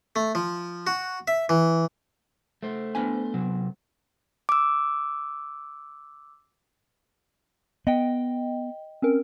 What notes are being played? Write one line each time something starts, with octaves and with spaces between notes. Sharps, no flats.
A3
F3
F#4
E5
E3
A3 C5
B3 D4 G#5
C3 F#3
D6 E6
B3 D#5 G5
C4 C#4 A#4